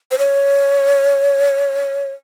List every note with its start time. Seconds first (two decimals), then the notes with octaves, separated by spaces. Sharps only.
0.11 C5
0.18 C#5